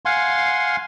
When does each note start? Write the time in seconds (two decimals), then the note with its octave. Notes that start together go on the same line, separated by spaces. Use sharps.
0.05 F5 F#5 G#5 C6